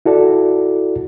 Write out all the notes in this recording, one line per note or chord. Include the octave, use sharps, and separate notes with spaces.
E4 F#4 A4 D5